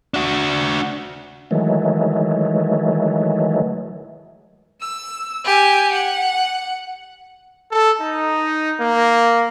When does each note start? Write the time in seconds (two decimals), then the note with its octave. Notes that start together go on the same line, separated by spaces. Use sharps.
0.14 D4 F#4
1.51 D#3 E3 F#3 G#3 A3
4.82 E6
5.45 G4 G#5
5.92 F#5
7.72 A4
8.01 D#4
8.80 A#3